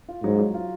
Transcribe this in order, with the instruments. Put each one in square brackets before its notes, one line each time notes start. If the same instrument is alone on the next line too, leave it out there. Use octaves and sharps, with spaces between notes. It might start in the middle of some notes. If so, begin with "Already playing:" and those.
[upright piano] F4
[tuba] G#2 [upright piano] F#3
[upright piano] F#3
F4